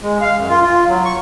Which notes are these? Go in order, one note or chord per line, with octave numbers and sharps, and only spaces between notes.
G#3
F5
F#2
F4
F4
F#3
C#6